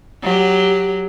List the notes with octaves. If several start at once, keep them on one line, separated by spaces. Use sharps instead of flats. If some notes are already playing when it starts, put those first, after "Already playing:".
F#3 G4